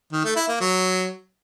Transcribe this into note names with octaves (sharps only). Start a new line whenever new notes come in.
D#3
A3
E4
A#3
F#3